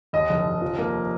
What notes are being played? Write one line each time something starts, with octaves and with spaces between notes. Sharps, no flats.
D#2 D#5
F1
D#2
F3
A#3